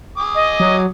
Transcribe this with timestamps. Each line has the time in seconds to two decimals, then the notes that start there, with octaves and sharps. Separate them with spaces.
0.18 G#5 D6 D#6
0.35 D#5
0.60 F#3